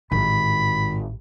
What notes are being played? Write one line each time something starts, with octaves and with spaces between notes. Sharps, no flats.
A1 G#2 D#3 B5